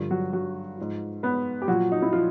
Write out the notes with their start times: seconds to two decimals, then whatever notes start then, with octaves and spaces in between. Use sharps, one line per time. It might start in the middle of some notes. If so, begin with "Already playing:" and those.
Already playing: G2 D3 F3
0.10 F#3 F#4
0.33 F#3 F#4
0.78 G#2 F3
1.23 B3 B4
1.62 G4
1.68 A#2 F3 F#3 F#4
1.92 D#4
2.02 E4
2.13 F3 F4